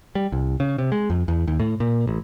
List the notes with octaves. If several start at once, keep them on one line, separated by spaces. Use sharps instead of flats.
G3
C2
C#3
C3
G#3
F2
E2
D#2
A2
A#2
A1